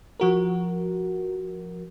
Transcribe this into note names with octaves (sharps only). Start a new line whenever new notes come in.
F3 F#4 A#4